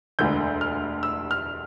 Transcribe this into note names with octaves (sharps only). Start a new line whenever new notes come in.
E1 D2 D3 G6
F6
E6
F6